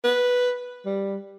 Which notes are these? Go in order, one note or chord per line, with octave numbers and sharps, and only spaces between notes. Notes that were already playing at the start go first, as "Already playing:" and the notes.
B4
G3